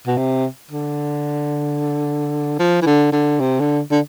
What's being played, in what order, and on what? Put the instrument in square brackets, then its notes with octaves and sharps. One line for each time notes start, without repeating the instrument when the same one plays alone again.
[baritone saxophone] B2
C3
D3
F3
E3
D3
D3
C3
D3
D3